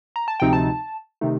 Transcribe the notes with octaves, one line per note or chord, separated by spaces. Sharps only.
A#5
A5
D2 C3 F3 C4 D#4 G5
A5
C3 D#3 A3 D#4